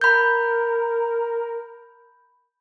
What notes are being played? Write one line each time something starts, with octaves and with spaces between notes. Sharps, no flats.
A#4 B5 G6